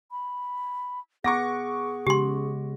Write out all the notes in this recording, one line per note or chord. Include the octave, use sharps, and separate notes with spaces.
B5
B3 G#4 F#5 C#6 D6 A#6
C#3 G#3 G4 C6